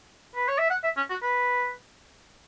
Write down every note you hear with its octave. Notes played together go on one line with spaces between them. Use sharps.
B4
C#5
E5
F#5
E5
C#4
F#4
B4